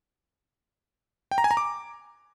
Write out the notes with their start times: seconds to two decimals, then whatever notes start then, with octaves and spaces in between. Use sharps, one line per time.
1.31 G5
1.38 A#5
1.44 G#5
1.51 A#5
1.57 D6